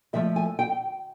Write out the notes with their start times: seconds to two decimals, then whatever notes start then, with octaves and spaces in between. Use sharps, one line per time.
0.13 A2 F3 A3 E5
0.36 G#5
0.59 G5